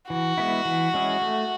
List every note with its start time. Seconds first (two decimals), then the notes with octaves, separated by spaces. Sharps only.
0.10 E3 F#4
0.38 G#3 B3 E4
0.65 E3
0.94 G#3 C#4 E4 G#4
1.22 A3